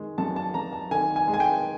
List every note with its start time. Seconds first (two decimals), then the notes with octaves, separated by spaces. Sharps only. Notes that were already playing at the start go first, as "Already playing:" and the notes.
Already playing: D#3 G#3
0.18 F#2 A5
0.36 A5
0.54 F#2 A#5
0.73 A5
0.91 D#3 G#5
1.16 G#5
1.28 G#3
1.34 G#5
1.40 G5